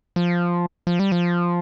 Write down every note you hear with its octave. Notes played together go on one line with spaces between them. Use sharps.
F3
F3
G3
F3